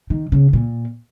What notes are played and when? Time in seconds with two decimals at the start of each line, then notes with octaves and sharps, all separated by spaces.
0.10 D#3
0.32 C#3
0.53 A#2